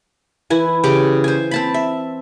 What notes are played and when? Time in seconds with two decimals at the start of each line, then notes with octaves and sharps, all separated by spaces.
0.50 E3 E4 G#5
0.84 C#3 G4 C#5 D6
1.24 C5 G#5
1.51 C4 A5 B5
1.74 E5